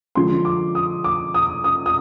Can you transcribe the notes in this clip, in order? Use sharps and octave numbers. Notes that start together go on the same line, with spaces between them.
D3 F3 G#3 C#4 C6
D6
D#6
D6
D#6
D#6
D#6